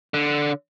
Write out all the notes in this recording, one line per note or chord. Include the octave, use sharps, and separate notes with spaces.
D3